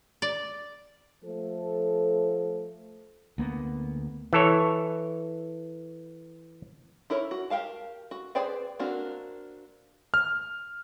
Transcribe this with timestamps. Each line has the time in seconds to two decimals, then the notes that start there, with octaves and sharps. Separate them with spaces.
0.22 D5
1.24 F3 A3 A4
3.38 D2 A#3 B3
4.33 E3 A4 C#5
7.10 D#4 E4 A#4 C#5
7.31 F#4
7.50 G4 A#4 F5 A5
8.11 F#4
8.35 G#4 B4 C5 D5 G5
8.79 A#3 C4 D4 F#4 A#4
10.14 F6